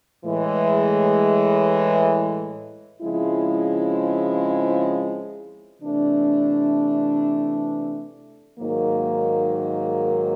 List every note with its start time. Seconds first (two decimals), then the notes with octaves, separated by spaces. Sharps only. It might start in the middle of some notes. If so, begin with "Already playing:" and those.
0.24 A2 E3 G#3
3.02 C#3 F3 G#3 C4 E4
5.81 C3 E3 A3 D4
8.59 G#2 D#3 F#3 A#3